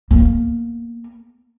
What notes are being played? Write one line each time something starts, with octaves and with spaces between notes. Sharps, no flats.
A#3 B3